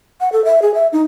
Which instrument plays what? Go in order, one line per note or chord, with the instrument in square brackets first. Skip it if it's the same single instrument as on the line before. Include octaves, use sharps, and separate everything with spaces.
[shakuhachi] F#5
A4
E5
G#4
E5
D#4